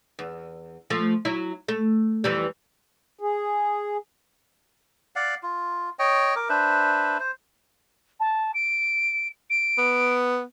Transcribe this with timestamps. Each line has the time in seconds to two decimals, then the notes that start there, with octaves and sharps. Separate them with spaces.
0.19 E2
0.90 F3 A3
1.25 F#3 E4
1.68 A3
2.24 F2 E3 G3
3.19 G#4
5.16 D5 F5 F#5
5.43 F4
5.99 C#5 D#5 G5
6.36 A#4 D6
6.49 D4 B4 C5 E5
7.20 C5
8.20 A5
8.54 D7
9.50 D7
9.78 B3